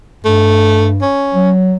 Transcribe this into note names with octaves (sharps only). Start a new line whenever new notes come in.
G2 A3
C#4
F#3